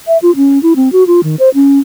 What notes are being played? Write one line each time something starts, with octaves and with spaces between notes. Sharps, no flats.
E5
F4
C#4
E4
C4
F#4
F4
D#3
C5
C#4